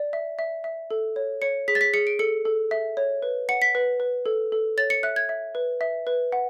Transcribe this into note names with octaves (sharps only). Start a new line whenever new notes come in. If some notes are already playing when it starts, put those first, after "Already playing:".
Already playing: D5
E5
E5
E5
A4
C#5
C#5 C#7
G#4 B6
A6
B6
G#4 C#7
D7
A4 C#7
A4
E5
C#5
B4
F#5 C#7
B6
B4
B4
A4
A4
C#5 A6
C#7
E5 F#6
G#6
E5
B4
E5
B4
F#5